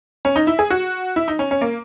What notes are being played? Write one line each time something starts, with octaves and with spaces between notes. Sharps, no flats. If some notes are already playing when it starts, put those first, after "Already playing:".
C#4
D#4
E4
G#4
F#4
E4
D#4
C#4
C#4
A#3